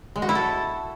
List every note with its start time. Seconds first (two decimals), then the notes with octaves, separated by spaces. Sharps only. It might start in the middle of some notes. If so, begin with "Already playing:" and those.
0.16 G#3
0.22 F#4
0.29 E4
0.35 A4